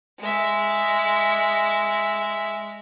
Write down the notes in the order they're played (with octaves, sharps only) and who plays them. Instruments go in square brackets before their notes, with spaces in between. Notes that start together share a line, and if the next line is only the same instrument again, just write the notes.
[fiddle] G#3 E5